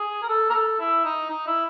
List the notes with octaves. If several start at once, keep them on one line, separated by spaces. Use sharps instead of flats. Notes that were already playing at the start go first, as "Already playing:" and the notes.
Already playing: G#4
A#4
A4
A#4
A4
E4
D#4
D#4
E4